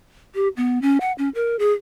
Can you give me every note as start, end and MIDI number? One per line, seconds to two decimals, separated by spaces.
0.35 0.48 67
0.57 0.81 59
0.82 0.98 61
1.01 1.12 78
1.18 1.29 61
1.35 1.56 70
1.59 1.73 68